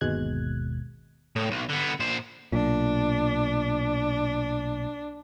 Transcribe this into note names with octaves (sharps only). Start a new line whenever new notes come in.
G1 D#2 B2 G#3 F#6 G#6
A2
B1
D3 B3
A#2 C5
B1 A#2 D4